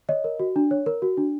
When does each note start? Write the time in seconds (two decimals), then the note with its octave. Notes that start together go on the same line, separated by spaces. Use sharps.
0.09 C#5 D#5
0.24 A#4
0.39 F#4
0.56 D4
0.71 C#5
0.86 A#4
1.02 F#4
1.17 D4